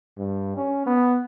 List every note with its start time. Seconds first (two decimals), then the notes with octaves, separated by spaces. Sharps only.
0.18 G2
0.56 C#4
0.86 B3